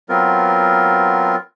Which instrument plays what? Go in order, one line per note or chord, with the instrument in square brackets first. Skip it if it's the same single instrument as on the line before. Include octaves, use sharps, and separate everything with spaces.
[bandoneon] F#3 B3 C4 F4 A#4